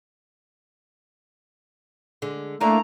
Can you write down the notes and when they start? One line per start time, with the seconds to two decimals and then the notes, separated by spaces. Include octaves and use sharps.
2.22 D3 G#3
2.61 A3 A#3 D4 E4 A#5